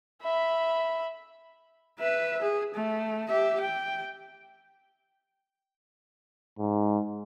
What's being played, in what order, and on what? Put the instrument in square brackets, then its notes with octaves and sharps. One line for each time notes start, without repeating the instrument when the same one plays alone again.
[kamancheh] E5 B5
[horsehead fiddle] B4 E5
G#4
A3
G4 E5
G5
[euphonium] G#2